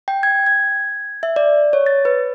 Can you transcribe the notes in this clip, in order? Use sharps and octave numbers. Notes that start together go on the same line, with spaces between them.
G5
G#6
G#6
E5
D5
C#5
A6
B4